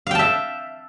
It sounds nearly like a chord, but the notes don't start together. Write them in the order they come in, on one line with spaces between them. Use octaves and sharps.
F5 G5 A5 E5